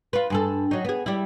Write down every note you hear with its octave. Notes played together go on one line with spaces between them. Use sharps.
F4 B4
G2 G#4 A4
F#3 D#4
B3 G#4
G3 E4